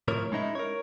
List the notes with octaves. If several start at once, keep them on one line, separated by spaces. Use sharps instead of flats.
A2 C3 F3 A#4 C#5
G#3 C#4 D#4 E4
A#4 C#5